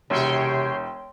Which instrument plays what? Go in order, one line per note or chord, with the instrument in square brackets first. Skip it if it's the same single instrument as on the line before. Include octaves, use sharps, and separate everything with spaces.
[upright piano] E1 [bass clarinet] C3 [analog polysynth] C#5 G5 C6